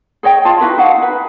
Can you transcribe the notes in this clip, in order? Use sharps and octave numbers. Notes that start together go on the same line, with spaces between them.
G#4 C#5 D#5 G5
F4 F5 A5
D#4 E4 F#4 B4
D#4 F5 F#5
D#4 B4